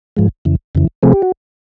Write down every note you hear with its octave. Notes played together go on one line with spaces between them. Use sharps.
G#2 F3 G#3
F2 C#3 E3
F2 C#3 E3
C3 F3 A3 C4 G#4
G4
F#4